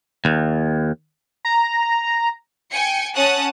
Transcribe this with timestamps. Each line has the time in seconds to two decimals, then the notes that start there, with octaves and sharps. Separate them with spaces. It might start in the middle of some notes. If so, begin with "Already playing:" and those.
0.25 D#2
1.45 A#5
2.71 G5 G#5 C#7
3.15 C#4 F#5 A5 D#6 F#6